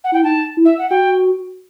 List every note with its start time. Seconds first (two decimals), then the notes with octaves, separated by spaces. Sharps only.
0.04 F#5
0.12 E4 G5
0.23 D#4 A5
0.57 E4
0.65 E5
0.78 F#5
0.89 F#4 G5